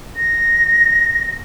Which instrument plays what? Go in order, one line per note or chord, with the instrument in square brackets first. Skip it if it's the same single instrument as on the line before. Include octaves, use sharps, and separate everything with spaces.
[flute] A#6